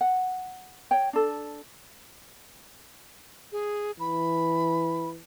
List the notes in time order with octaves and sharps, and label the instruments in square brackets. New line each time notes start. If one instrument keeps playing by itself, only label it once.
[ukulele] F#5
C#5 G5
D4 A4
[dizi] G#4
[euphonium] E3 [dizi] B5